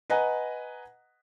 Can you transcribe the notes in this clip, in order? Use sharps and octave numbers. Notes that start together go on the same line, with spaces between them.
B4 D#5 F#5 G#5 A#5